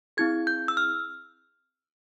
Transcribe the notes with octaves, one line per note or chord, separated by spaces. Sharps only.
C4 E4 G#4 G#6
G6
E6
F6